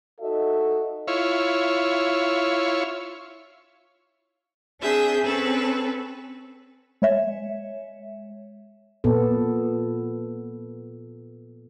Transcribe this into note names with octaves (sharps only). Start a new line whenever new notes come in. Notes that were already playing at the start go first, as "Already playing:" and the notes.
D#4 F#4 A4 D#5 E5
E4 F4 C#5
C4 D4 G#4 E5 G6
C4 C#4 A4 B4
G#3 C#5 E5
A#2 B3 A4